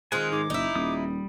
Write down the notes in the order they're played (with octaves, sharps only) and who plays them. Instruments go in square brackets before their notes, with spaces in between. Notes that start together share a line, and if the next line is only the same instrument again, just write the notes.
[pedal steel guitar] D#3 G#5 [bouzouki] G#3 C4 F4 [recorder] F#6
[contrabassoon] G#2 [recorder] D6
[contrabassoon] F#1 [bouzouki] D#4 E4
[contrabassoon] D#1 [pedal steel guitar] G3 D#6